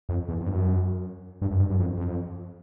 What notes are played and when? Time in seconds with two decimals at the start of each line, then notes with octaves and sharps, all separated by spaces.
0.09 F2
0.29 E2
0.41 F2
0.47 G2
0.53 F#2
1.42 G2
1.51 F#2
1.60 G2
1.70 F#2
1.80 F2
1.98 F2